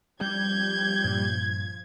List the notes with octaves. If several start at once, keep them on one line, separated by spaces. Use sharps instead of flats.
F3 G3 G6 G#6
G2 A#2